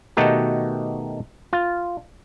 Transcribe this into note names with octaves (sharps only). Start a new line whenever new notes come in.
B2 D#3 A3 D#4 F#4 G4
F4